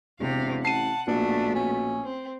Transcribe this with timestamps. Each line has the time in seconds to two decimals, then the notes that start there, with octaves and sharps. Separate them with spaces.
0.19 E1 C3 F5
0.65 A1 F#5 A5 C7 D#7
1.07 A#1 B2 A3 D4
1.55 C#4
2.04 C4